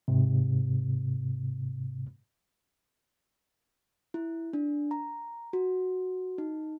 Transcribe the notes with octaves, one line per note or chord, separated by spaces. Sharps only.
G#2 C3
E4
D4
A#5
F#4
D#4